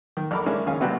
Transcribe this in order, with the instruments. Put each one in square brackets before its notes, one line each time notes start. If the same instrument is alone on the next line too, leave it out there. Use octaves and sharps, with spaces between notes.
[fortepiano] D#3
A#1 A4 A#4 B5 D6
G#3 A#3 C#4 D4 E4
D#2 C#3 C#4 F5 G#5
C3 F#3 B3 D4 F#5 G5